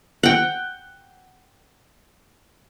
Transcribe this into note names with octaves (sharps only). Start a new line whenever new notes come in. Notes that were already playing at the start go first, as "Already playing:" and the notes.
F#5 G5